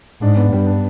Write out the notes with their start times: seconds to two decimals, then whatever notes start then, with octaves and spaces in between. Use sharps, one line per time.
0.22 G#2 D4
0.37 B3
0.52 G2 G3
0.67 D4